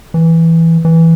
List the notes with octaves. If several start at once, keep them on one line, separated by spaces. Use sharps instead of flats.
E3
E3